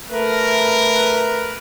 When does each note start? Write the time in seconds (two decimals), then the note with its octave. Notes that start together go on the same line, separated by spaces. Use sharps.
0.12 A3 A#4 B4